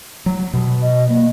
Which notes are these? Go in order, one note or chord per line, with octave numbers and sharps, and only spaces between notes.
F#3
B2
D#5
A#3